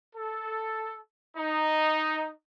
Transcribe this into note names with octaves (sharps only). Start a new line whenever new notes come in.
A4
D#4